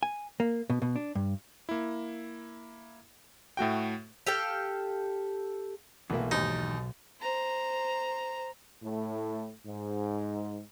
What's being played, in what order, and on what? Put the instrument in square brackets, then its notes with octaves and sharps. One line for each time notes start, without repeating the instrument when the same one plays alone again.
[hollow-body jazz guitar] G#5
A#3
B2
B2
D4
G2
[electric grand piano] A#3 E4
A2 A3 F#4 G5
[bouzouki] G4 A4 F5 G5
[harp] B1 B2 [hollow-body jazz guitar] E2 [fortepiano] E3 A3 A#3
[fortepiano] D#2 G#2 [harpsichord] D#4
[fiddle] C5 A#5
[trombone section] A2
G#2